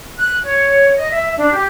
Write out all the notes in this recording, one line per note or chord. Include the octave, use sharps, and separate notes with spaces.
F#6
C#5
D#5
E5
D4
G4